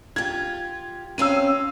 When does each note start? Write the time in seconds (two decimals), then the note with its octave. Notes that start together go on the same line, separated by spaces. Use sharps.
0.16 F4 G4 G#6
1.18 C4 C#4 F5 E6 D#7